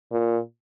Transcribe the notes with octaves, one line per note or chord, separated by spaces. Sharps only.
A#2